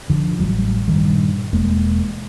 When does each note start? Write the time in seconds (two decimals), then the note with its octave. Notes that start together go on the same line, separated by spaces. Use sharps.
0.10 D3 F3
0.39 A1 F#3 G3
0.88 G2 A#2 D#3 G3
1.53 E1 G#3 A#3